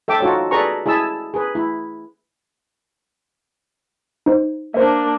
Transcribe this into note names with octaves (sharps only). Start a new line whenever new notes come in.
A4 E5 G5 D6
D#4 F4 F#4 A4 C#5
G#4 A4 B4 D5 A#5 C#6
E4 G#4 E5 A5 E6
G#4 B4
E4
D#4 C5
A#3 D4 C5 E5